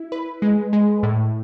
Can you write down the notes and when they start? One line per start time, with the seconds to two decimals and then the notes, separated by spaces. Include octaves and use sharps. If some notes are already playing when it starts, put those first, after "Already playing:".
Already playing: E4
0.12 B4
0.42 G#3
0.73 G#3
1.03 A2